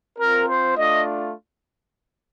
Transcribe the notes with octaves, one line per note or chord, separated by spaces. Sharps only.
C4 F4 A#4
C5
A3 D4 F4 D#5